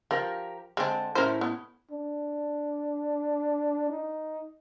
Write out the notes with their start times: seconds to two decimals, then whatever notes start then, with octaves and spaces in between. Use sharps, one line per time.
0.11 F3 G4 A#4 F5
0.77 D3 G#3 C4 A5
1.15 A2 C#4 E4 A#4 C5
1.41 B3
1.91 D4
3.90 D#4